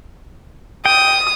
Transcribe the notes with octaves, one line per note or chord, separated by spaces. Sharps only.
G5 D#6